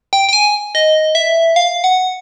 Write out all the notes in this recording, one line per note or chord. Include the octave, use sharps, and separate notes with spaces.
G5
G5
G#5
D#5
E5
F5
F#5